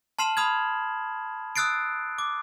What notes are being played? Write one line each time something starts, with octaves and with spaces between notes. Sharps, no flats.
A5 C6 F6 C7 E7 F#7
B5 D#6 F6 G#6
D#6 E6 F#6 A6 C7 D7
D6